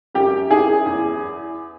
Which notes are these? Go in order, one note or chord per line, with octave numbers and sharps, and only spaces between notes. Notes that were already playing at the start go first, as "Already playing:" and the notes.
F#2 G4
E3 G#4
E2